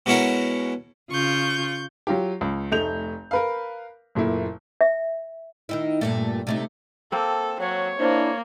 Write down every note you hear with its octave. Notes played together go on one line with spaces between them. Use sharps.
B2 G#3 C#4 E4 F#4 A#4
C#3 F4 C#6 G6
F#3 F4 G4
C#2
F1 A3 D#4 G6 F7
A#4 B4 F5
F#1 A#2 A3 E4
E5
D#3 D#4 E4
G2 A#2 A3
C3 A3 D#4
A#3 C4 A4
F#3 C#5
A#3 D4 E4 C5